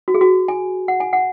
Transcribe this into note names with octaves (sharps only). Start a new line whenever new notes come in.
F#4
G#4
F#4
G#5
F#5
G#5
F#5